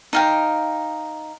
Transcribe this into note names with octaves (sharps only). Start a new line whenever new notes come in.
D#4 F5 G5